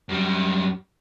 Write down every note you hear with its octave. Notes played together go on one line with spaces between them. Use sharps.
F#2 G3